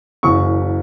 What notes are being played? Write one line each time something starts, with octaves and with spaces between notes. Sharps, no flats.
F#1 F#2 E3 C#6